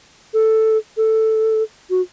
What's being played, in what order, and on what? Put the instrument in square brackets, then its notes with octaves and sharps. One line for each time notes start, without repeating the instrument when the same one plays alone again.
[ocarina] A4
A4
F#4